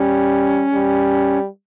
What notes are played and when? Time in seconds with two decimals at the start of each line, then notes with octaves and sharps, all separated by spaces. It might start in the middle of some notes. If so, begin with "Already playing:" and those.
Already playing: G3 C#4
0.73 G3